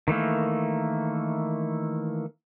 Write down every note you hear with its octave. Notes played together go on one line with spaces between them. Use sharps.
D#3 E3 A3 A#3